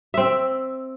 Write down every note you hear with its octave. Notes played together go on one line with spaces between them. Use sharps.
C4 E5